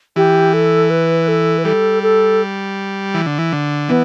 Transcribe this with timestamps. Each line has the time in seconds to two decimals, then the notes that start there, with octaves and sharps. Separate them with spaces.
0.16 E3 G4
0.54 A4
0.90 B4
1.28 A4
1.58 B4
1.65 G3 A4
2.03 A4
3.14 E3
3.26 D3
3.39 E3
3.52 D3
3.89 E3 B3